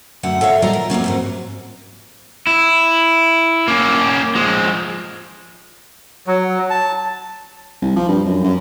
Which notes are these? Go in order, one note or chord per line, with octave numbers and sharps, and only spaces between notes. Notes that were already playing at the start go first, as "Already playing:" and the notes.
F#2 D3 A3 F#5
A4 C#5 E5 F5
A#2 D#3 G3 F4 A#4 A#5
A#4
F2 F#3 A#3 C#4
F2 G#2 F#3
E4
A#3 C#4
F3 G#3
F#3
A5
C2
F3
G2
F#2
F#2